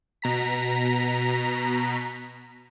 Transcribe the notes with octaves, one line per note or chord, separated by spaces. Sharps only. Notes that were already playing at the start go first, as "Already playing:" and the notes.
B2 A#5 B6